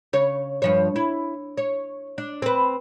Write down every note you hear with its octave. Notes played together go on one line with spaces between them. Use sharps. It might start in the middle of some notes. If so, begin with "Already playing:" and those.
C#3 C#5
G2 F3 C#5
E4
C#5
D4
C4 B4